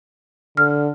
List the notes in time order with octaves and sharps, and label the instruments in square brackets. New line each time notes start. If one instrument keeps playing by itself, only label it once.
[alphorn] D3 [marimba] F6